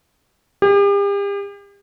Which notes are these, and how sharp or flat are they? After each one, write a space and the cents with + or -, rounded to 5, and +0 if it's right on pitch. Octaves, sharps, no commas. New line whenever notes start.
G4 +40